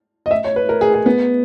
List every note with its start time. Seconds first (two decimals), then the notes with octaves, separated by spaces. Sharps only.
0.26 D#5
0.31 E5
0.44 C#5
0.56 B4
0.69 A#4
0.81 G#4
0.94 G#4
1.06 B3